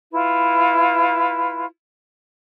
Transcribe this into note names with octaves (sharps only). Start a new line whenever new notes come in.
E4 F4 B4